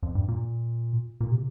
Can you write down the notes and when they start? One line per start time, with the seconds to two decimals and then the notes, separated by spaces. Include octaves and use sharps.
0.03 F2
0.15 G2
0.28 A#2
1.21 A#2
1.31 C3